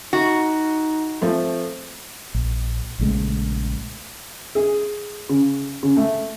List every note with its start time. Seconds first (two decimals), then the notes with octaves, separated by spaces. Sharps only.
0.13 D#4 F#4
1.21 F3 A3 C4
2.35 A#1
2.99 A#1 C#3 G#3 A3
4.55 G#4
5.29 C#3
5.83 C#3
5.97 A3